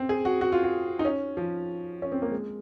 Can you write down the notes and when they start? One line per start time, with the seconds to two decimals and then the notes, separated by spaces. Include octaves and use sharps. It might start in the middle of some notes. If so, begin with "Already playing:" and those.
Already playing: C4
0.09 G#4
0.25 F#4
0.41 F#4
0.52 F4
0.64 F#4
0.99 D#4
1.05 C#4
1.37 F3
2.02 C#4
2.12 C4
2.22 A#3
2.32 G#3